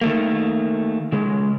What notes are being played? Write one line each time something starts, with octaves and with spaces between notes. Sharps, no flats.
D#3 A3 A#3
C#3 G#3